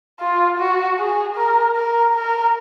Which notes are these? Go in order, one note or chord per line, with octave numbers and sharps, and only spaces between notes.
F4
F#4
G#4
A#4
A#4
A#4